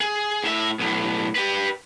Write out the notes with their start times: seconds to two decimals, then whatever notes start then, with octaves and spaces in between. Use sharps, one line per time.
0.01 G#4
0.44 A2 E5
0.79 B1 A2
1.35 G4 B4